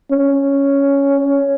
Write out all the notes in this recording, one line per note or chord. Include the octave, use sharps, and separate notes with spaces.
C#4